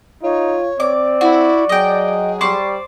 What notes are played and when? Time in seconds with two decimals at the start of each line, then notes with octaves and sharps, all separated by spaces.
0.23 D#4 F4 C#5
0.80 C4 D5 D6
1.21 E4 F#4
1.69 F#3 G#4 D#5 G5
2.41 G3 C5 D5 C#6